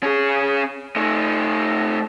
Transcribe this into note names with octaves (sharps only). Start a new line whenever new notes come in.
C#4 G#4
A3 D#4